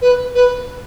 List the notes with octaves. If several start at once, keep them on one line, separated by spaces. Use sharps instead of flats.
B4
B4